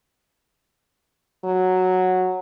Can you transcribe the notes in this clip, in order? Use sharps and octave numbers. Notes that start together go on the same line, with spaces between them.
F#3